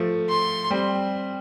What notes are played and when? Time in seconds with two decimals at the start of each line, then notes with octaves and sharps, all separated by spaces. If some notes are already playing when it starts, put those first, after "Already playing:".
Already playing: F3 A3
0.29 C6
0.70 G3 C4